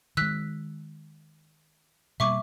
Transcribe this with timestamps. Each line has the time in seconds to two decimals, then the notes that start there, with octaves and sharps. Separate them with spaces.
0.17 D#3 G#3 E6 F#6 B6
2.20 B2 G3 A#3 E5 C#6 D6